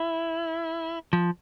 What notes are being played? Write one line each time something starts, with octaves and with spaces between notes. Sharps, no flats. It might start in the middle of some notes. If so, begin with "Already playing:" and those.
Already playing: E4
F3